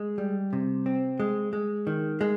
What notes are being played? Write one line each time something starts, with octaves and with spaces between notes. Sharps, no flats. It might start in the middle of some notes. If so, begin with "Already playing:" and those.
Already playing: G#3
G3
C3
C4
G#3
G#3
D#3
G#3